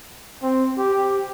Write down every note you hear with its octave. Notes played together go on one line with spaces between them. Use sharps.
C4
G4